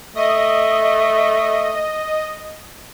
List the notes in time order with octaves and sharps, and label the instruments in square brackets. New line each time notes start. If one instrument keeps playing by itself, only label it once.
[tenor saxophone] A3 [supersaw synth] D#5